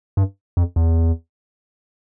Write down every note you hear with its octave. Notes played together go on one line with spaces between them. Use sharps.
G2
F2
E2